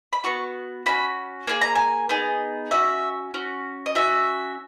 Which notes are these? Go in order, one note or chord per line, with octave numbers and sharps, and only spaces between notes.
B5
B3 F#4 C#6
C#4 F#4 B5
A#3 E4 G#4 G#5
A#5
G#5
B3 D#4 G#4
C#4 F#4 E5
C#4 F#4
D#5
C#4 F#4 E5